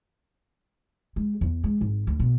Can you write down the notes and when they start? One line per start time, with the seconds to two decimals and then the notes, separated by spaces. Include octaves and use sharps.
1.16 G#3
1.41 E2
1.64 G#3
1.81 G#1
2.07 D2
2.20 B2